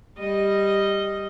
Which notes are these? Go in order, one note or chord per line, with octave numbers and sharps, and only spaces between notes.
G3 D#5